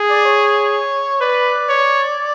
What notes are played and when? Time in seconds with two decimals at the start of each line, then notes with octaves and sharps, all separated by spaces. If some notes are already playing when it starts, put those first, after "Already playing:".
Already playing: G#4
0.11 D5
0.25 C#5
1.21 B4 D5
1.69 C#5